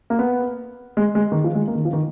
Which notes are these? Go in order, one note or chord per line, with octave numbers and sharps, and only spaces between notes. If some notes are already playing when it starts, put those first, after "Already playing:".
A#3
B3
G#3
G#3
D#3
F3
G#3
A#3
D#3
F3
D#3